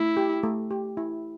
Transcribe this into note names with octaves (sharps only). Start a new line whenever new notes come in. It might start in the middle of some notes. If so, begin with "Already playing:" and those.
Already playing: A3 E4
G4
A3
G4
E4